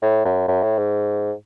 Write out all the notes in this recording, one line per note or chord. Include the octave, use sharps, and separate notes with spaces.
A2
F#2
F#2
A2
G#2